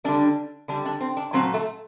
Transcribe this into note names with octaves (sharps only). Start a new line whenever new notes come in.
D3 G3 D4
D3 G3 D4
D4
C4
D4
A#2 F#3 A3 C4
A3